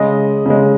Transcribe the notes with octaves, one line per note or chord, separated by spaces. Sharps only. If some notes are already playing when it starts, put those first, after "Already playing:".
Already playing: C#3 G#3 D#5
C#3 G#3